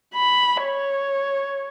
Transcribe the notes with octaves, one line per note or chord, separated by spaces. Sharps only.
B5
C#5